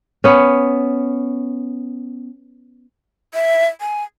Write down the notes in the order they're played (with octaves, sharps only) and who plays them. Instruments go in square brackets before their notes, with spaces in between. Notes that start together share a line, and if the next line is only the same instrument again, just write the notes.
[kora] B3 C#4
[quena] E5
G#5